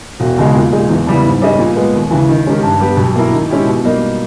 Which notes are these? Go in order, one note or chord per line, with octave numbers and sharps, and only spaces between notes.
E1
D#2 C#3 G#3
A#2
G#3 D#4 G#4
E2
C#3 G3 B3 E4
G#2
G3 C#4 G#4 D#5
A#2
G#3 B3
D#2
C#3 E3
D#3
G#3 C#4 G4 A#4
G2
G3 B3 G4
B1
B2 A#3 E4 A#4
D#3
G#3 C#4 E4 G4
B2
G3 A#3 D#4